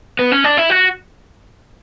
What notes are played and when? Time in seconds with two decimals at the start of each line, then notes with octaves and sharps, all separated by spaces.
0.19 B3
0.32 C#4
0.44 D4
0.57 E4
0.70 F#4